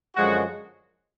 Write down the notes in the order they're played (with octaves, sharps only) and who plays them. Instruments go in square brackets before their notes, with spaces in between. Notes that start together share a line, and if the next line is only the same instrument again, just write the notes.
[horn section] F#2 D3 F3 G#3 F#4